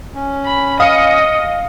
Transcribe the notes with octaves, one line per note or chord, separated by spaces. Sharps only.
C#4
B5
D#5 F5 D#6 C#7